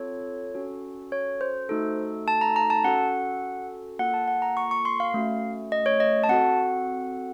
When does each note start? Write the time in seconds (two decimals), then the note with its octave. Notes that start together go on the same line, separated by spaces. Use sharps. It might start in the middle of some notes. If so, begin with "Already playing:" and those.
Already playing: C4 F4 A4 C#5
0.55 C#4 F#4 A4
1.12 C#5
1.41 C5
1.69 A3 D#4 F#4 A4
2.28 A5
2.41 A#5
2.56 A#5
2.70 A5
2.84 C#4 F#4 A4 F#5
3.99 A#3 F4 A4 F#5
4.14 A5
4.28 F#5
4.42 A#5
4.57 C#6
4.71 C#6
4.85 C6
5.00 F5
5.14 A3 C#4 F#4
5.72 D#5
5.86 C#5
6.00 D#5
6.24 A5
6.29 C4 F#4 A4 F#5